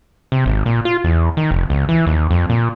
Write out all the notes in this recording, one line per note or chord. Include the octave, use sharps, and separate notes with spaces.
C3
G#1
A#2
F4
E2
D#3
F1
C#2
E3
D#2
F2
A#2